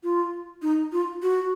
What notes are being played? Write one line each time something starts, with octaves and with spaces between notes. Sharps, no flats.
F4
D#4
F4
F#4